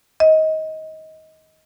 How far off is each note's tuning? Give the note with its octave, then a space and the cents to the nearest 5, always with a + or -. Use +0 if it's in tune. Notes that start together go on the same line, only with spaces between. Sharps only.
D#5 +20